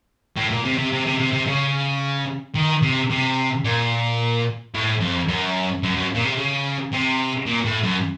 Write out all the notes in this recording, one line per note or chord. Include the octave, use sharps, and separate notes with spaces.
A2
A#2
C3
C3
C3
C3
C3
C3
C#3
D#3
C3
C3
A#2
A2
F2
F#2
F#2
F#2
A#2
C3
C#3
C3
A#2
A2
F#2